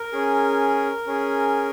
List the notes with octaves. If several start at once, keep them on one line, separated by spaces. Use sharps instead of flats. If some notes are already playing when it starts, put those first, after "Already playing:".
Already playing: A#4
C#4 G#4
C#4 G#4